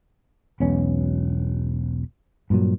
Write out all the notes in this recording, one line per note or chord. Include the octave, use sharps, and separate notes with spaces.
E1 B1 B2 C#4
G2 A#2 F#3